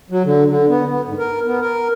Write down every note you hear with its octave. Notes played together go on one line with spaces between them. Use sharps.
F#3
D3
D3
B3
B3
G#2
A#4
B3
A#4